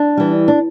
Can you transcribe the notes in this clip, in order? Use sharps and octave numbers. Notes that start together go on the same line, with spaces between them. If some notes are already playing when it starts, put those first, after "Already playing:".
Already playing: D4
E3 G3
D4